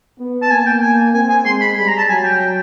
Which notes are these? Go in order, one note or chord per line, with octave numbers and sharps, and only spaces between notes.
B3
A5
A#3 G#5
G5
G#5
C4 G#5
G#5
G#3 C6
B5
G3 B5
A#5
A5
F#3 G#5
G5